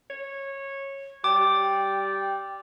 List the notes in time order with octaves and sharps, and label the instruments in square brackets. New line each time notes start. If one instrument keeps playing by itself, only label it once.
[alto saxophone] C#5
[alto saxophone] G3 [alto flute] G5 [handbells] D6